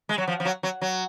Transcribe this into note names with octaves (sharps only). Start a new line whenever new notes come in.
G#3
F#3
F3
F3
F#3
F#3
F#3